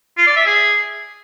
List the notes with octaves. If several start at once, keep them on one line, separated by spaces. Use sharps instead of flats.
F4
D5
E5
G#4